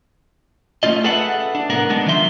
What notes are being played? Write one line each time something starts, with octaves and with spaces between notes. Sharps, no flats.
A3 C4 C#4 F4 D#5
G#4 A4 B4 E5 F#5
D4
C2 A2 B3 A#4 F#5
G#3 B3 D4
D#3 F3 F#3 E5 C6